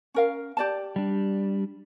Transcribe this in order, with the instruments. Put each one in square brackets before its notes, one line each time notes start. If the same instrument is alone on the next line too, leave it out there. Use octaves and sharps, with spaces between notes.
[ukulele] C#4 A#4 F5
G4 D5 A5
[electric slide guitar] G3 D4